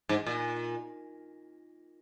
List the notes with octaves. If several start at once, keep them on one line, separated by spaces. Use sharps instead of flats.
G#2
A#2